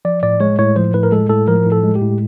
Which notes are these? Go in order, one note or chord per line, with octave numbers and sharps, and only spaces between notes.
F3 D5
A2 D5
G#3 C#5
A2 C#5
F3 C5
A2 B4
A#4
G#3 A4
A2 A4
F3 A#4
A2
A4
G#3
G4
A2